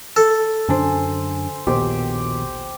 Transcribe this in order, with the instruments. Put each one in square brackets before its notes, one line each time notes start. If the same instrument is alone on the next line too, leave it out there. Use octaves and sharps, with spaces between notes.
[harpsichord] A4
[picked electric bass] F#2 D3 D4 [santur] C5 G#5
[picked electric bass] A#1 D#2 B2 [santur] G4 C5